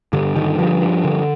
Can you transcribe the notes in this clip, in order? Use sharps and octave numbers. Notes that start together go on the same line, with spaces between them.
G2 D3
D3 D#3
G2 F3
G2
D3